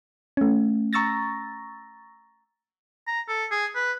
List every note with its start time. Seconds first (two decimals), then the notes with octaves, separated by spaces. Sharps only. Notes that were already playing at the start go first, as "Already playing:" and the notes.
0.37 A3 C#4
0.93 A#5 C#6 E6 A6 A#6
3.07 A#5
3.28 A4
3.51 G#4
3.75 B4